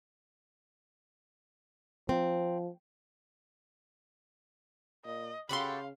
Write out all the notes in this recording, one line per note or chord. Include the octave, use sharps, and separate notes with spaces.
F3 C4
A#2 D#5
C#3 F#4 G4 A4 F5 B5 C6